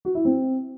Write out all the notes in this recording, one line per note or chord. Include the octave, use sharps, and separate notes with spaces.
F#4
E4
C4